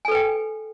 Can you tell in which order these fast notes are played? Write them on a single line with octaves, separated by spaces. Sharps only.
G#5 A4 B4 G5